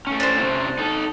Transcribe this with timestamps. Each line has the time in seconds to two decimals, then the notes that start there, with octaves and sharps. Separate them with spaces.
0.07 A3 C#4
0.20 D4 C5
0.39 C3 C#4 E4
0.78 D#4 A4